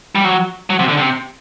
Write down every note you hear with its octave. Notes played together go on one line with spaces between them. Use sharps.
G3
F#3
F#3
C3
D3
C3